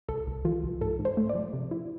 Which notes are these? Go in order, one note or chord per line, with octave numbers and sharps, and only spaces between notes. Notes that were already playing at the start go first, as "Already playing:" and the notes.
C2 A4
C2
E3 F4
C2
G#2 A4
G#2
C5
A3
D5
F3
C3
E4